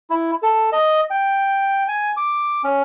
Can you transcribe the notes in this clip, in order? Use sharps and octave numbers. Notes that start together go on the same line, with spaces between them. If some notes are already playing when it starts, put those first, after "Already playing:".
E4
A4
D#5
G5
G#5
D6
C#4